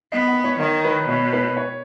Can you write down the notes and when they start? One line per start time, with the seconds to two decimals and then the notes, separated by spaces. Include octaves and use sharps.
0.12 B3 D#5
0.28 F#5
0.44 C#5
0.60 D#3 C#5
0.85 B4
1.08 B2 C#5
1.33 B4
1.57 C#5